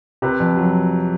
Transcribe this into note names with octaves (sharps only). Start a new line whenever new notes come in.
C3 B4
F2
F#3